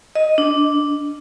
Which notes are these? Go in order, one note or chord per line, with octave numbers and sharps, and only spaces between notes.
D#5
D4